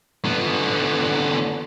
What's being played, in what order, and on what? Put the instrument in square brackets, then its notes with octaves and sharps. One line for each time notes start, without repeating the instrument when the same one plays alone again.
[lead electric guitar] D3 B3